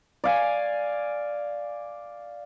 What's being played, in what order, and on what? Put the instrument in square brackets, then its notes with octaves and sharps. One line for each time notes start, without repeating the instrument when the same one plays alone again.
[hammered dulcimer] D5 F5 G#5